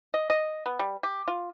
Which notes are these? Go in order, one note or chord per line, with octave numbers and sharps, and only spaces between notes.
D#5
D#5
B3
G3
G4
F4